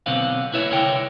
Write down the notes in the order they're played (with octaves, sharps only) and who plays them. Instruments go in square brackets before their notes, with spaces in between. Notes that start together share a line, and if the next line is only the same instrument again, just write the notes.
[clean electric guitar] B1 B2 D3 B3 C4 F5
E4 B4 C#5 E5
C2 D3 A#4 C#5 G5